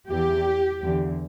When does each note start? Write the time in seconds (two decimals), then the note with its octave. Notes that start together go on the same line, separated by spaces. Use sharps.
0.08 E2 E3 G4
0.82 E2 D3